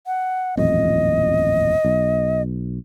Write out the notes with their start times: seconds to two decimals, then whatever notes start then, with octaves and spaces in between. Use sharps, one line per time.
0.07 F#5
0.57 D#1 A1 F2 D#5
1.84 B1